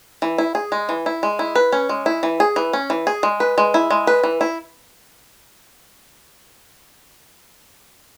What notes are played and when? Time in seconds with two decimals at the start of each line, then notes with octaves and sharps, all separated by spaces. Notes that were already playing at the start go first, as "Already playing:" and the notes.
0.22 E3
0.38 E4
0.55 G#4
0.72 G#3
0.89 E3
1.06 E4
1.23 G#3
1.39 E4
1.55 B4
1.72 C#4
1.89 G#3
2.06 E4
2.23 E3
2.40 G#4
2.56 E3
2.73 C#4
2.90 E3
3.07 G#4
3.23 G#3
3.40 B4
3.58 G#3
3.74 E4
3.91 G#3
4.07 B4
4.23 E3
4.41 E4